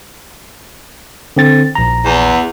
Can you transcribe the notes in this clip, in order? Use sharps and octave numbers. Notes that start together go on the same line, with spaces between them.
D3 C4 A6
A#1 A#5
E2